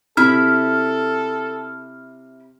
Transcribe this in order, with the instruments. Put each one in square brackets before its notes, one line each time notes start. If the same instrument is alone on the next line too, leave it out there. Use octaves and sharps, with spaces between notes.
[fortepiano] C3 [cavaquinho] E4 B5 [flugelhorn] A4 [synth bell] F6